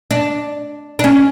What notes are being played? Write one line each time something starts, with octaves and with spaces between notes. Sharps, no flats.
D4
D4
C#4